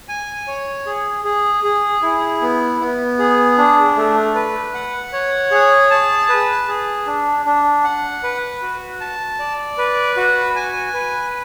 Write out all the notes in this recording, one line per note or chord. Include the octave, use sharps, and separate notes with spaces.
G#5
C#5
G#4
G#4
G#4
E4
B3
B3
G#4
D4
A3
B4
F#5
C#5
G#4
A5
B4
G#4
D4
D4
F#5
B4
F#4
A5
D5
B4
F#4
G#5
B4